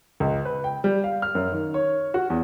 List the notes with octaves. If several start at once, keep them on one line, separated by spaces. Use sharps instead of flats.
C#2
B4
G5
G3
F5
F6
F#2
D#3
C#5
F#4
E2